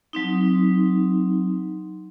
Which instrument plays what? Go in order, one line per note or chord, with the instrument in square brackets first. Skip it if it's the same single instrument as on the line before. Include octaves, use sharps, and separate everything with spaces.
[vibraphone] F#3 C4 D#4